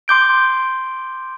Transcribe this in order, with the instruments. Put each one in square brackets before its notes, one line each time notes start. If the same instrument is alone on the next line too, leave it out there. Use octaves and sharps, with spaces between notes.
[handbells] C6 D6 G6 D7